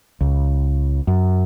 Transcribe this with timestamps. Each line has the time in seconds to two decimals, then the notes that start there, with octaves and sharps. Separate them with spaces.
0.21 C#2
1.07 F#2